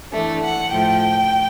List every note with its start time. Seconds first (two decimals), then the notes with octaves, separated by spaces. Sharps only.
0.12 E3 A3 D4
0.41 F#5
0.71 A2 F3 A3 G5